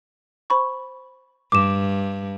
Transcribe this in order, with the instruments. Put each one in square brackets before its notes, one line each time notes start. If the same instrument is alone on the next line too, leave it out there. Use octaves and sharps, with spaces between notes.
[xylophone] C5 B5 C#6
[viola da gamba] G2 [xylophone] D6 E7